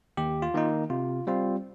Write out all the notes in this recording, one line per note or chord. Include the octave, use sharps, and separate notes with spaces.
D#2 G4
F4
D#3 A#3 D#4
C3 F4
G3 C4 F4